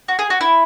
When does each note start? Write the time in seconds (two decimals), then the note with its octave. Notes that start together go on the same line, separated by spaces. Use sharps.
0.08 F#4
0.19 G#4
0.30 F#4
0.41 E4